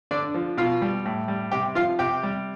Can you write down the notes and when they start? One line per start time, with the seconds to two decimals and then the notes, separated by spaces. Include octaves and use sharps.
0.11 D3 D4 D5
0.34 F3
0.57 B2 F4 F5
0.82 G3
1.06 A2
1.28 G3
1.51 C3 G4 G5
1.75 F3 F4 F5
1.99 C3 G4 G5
2.23 G3